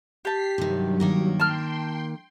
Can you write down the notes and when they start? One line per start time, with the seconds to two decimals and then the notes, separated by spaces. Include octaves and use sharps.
0.25 G4 A5 B6 C7
0.58 G2 C3 D#3 F#3
1.00 D#3 A#3 A#4
1.40 G5 A5 C6 F6